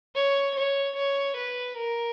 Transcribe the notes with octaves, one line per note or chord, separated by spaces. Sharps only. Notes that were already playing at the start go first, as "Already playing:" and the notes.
C#5
C#5
C#5
B4
A#4